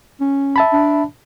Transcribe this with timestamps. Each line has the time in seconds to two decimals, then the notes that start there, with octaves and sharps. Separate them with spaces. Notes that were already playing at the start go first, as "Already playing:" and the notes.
0.20 C#4
0.56 E5 A5 B5
0.73 D4